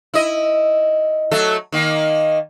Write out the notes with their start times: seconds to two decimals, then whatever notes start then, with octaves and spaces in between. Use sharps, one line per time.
0.14 E4 D#5
1.31 F#3 A3 A4
1.72 D#3 A#3